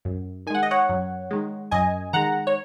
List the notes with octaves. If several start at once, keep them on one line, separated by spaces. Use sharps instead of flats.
F#2
D#3 G#3 F#5 G#5
D#5
C#5 F#5
F#2
D#3 G#3
F#2 D#5 G#5
D#3 G#3 F#5 A#5
C#5